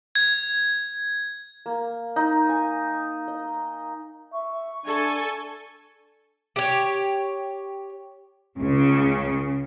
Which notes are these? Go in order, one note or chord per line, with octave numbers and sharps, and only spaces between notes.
G#6
A#3
D#4
G#5
D#5
E5 C#6
D4 A4 G#5
G4 C#5
C#2 C#3